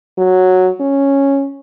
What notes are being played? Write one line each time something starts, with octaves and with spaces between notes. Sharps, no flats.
F#3
C#4